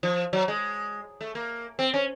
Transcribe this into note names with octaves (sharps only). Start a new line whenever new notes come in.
F3
F#3
G#3
A3
A#3
C4
C#4